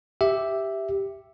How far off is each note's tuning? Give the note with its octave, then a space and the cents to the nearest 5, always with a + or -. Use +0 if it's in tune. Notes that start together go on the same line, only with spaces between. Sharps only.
G4 +0 E5 +0